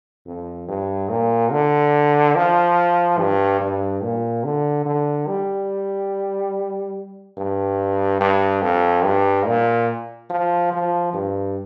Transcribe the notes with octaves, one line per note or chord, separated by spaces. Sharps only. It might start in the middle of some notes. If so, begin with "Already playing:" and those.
F2
G2
A#2
D3
F3
G2
G2
A#2
D3
D3
G3
G2
G2
F2
G2
A#2
F3
F3
G2